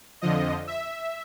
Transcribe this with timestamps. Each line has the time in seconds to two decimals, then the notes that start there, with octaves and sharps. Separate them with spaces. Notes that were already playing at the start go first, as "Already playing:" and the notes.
0.22 F2 D3 F3 D#5
0.67 E5